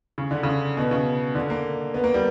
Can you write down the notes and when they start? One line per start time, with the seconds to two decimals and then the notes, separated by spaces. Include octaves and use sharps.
0.18 C#3
0.31 D3
0.43 C#3
0.77 B2
0.91 C#3
1.35 D3
1.50 A#3
1.94 B3
2.04 A#3
2.14 G3